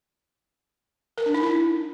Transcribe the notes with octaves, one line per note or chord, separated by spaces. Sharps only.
A#4
D4
D#4
E4